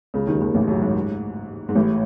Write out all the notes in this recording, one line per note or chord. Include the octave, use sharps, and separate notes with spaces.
C#2 C#3
D#2 D#3
D#2 D#3
A1 A2
F#2
G#2
G#2
A1 A2